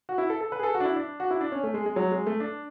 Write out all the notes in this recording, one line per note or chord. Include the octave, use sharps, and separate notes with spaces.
F#4
E4
A4
A4
B4
G#4
A4
F#4
D4
E4
D4
F#4
E4
D4
C#4
A3
G#3
G#3
F#3
G#3
A3
D4